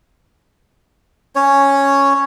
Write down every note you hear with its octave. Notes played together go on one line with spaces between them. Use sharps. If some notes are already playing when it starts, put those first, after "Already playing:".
C#4 C#5